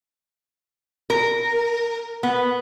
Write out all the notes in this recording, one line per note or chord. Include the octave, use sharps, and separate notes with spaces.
A#4
B3